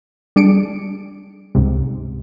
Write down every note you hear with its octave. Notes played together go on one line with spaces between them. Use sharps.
G3 D4 G#4 C#7 D7
C#2 G#2 C3